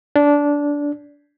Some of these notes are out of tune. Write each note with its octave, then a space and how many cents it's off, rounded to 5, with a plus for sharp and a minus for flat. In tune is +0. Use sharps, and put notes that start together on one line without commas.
D4 -15